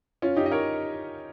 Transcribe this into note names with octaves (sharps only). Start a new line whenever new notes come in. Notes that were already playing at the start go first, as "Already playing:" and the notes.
C#4 F4
D#4 G4
D#5
A#4 C#5